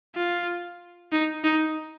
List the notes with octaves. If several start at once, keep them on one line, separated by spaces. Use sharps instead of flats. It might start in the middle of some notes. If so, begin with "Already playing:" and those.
F4
D#4
D#4